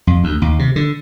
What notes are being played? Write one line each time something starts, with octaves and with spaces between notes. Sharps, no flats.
F2
D2
D#2
C3
D3